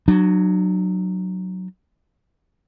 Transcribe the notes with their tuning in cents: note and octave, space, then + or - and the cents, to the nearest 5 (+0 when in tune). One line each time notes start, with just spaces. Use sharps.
F#3 +0 D4 +40